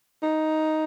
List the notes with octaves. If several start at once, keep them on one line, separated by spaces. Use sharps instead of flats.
D#4